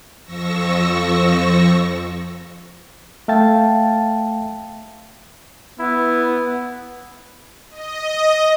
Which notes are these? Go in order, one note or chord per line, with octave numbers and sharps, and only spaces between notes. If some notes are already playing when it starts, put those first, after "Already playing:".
F2 F3 C#6 E6 A#6
A3 E5 F5 G5 A5 A6
B3 E4
D#5